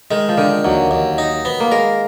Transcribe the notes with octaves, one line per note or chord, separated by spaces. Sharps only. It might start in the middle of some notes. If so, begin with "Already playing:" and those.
D#3 G#3
F3
D3 D#3
D#2 F#3
D#2
D#4
B3
A#3
G#3 A#4